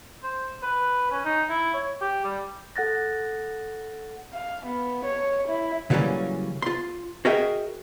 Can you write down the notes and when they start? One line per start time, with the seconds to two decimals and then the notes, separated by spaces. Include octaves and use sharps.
0.23 C5
0.62 B4
1.11 C#4
1.25 D#4
1.49 E4
1.74 C#5
2.01 G4
2.24 G3
2.76 A4 F#5 F#6 A6 A#6
4.33 F5
4.66 B3
5.05 C#5
5.48 E4
5.90 C#3 E3 F#3 G3 A#3 C#4
6.62 F4 C6
7.25 F#4 G#4 A#4 D#5 E5 G5